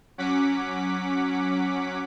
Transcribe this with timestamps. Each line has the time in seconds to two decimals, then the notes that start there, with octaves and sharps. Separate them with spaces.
0.18 F#3 C#4 F#5 D6 B6